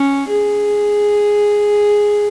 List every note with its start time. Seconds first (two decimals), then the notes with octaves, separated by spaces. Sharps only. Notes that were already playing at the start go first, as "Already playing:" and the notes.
Already playing: C#4
0.28 G#4